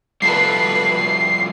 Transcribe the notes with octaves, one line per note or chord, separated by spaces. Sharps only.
F3 G3 A3 A4 B4 C7